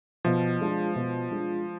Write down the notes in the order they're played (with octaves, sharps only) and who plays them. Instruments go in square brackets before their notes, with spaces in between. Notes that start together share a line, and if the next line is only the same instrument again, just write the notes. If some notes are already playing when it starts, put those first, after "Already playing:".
[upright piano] B2 [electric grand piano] F3
[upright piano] G#3 D4 F4
B2
G#3 D4 F4